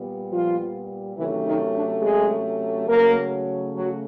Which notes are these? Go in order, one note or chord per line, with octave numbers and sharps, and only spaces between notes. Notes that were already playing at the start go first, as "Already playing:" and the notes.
Already playing: A#2 G3 B3
F3 F4
C3 D#3 E3 F#3 A3 C#4 E4
D#3 D#4
D4
G#3 G#4
C#3 F#3 A3 A#3 A#4
F#3 F#4